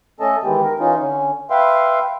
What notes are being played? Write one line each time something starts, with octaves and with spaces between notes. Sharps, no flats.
A3 C#4 A4 D#5 A5
D#3 E3 G#3 B3 G4
A#4
E3 C#4 D#4 F4
D3 C#4
B4 E5 F5 G5 C6